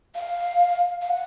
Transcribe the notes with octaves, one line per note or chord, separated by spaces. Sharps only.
F5
F5
F#5